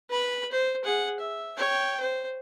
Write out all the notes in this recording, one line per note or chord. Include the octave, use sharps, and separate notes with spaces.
B4 B5
C5
G#4 F#5
E5
C#5 G5
C5